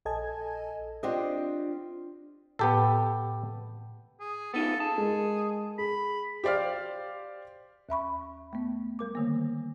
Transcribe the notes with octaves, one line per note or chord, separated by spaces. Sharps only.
A#1 A4 D#5 G#5 A5 G#6
C4 D4 F4 G4 C5 D#5
A2 B3 G4 A4
G#4
B3 D#4 F4 A4
G#4 A5
G#3 A#4
G#4 B5
G4 C5 D5 F5 F6
D#2 E5 B5 C#6
A3 B3
G3 A#4 D6
D3 D#3 A#3